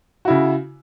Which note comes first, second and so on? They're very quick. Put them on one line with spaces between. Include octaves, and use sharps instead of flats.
F#4 E4 C#3